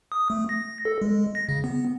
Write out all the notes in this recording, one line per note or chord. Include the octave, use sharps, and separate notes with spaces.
D#6
A3
A#6
A4
G#3
A#6
C#3
B3